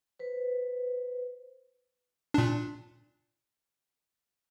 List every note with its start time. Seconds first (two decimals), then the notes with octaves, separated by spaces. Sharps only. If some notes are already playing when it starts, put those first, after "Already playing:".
0.19 B4 C5
2.34 A#2 D4